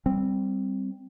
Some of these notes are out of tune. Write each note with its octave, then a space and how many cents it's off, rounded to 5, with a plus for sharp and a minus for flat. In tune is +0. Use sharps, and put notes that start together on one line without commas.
G3 +0 C4 +0